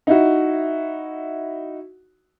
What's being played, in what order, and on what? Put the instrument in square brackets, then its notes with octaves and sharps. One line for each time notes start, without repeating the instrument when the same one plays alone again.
[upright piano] D#4 E4 F#4